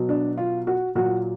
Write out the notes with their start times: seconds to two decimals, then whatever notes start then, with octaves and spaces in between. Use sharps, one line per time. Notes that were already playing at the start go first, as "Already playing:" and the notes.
Already playing: B2 F#3
0.09 D4
0.38 F4
0.67 F#4
0.95 A#2 F#3 F#4